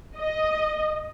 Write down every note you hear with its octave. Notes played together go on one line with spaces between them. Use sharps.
D#5